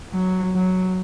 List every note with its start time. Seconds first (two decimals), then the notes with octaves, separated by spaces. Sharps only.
0.13 F#3
0.54 F#3